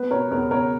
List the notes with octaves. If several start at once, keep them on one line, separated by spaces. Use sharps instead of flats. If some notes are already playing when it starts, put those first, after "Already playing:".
Already playing: B3 B4
B2 A#4 C#5
E2 A#4 C#5
E2 A#4 C#5